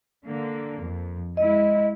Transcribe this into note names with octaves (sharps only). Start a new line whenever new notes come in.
D3 A#3
F2
G#3 E4 D#5